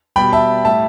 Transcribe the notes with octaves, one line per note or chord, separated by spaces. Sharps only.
B2 G3 G5 B5
E5 A5
A2 G3 E5 A5